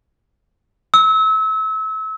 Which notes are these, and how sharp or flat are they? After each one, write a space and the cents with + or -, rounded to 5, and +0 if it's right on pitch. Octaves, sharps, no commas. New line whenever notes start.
E6 -30